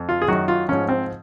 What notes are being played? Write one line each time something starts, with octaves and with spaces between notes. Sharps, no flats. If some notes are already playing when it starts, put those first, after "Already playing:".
Already playing: F2
F4
G#4
F#2 D#3 F#3 F#4
F4
G#2 F3 C#4
C4